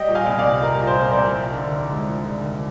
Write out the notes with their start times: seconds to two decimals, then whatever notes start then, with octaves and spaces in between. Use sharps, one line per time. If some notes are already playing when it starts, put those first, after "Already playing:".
Already playing: G3 D#5 G5
0.09 A#2
0.15 F5 G#5
0.27 C2
0.39 D5 F5
0.45 C2
0.63 G3 A#4
0.81 A#2
0.87 C5
0.99 C2
1.11 A#4 D5
1.17 C2
1.35 F3
1.53 D3
1.71 D#2
1.89 G#3
2.07 F3
2.26 D3
2.44 D#2